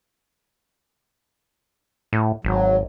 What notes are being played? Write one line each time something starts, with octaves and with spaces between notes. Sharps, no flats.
A2
G#1 F#3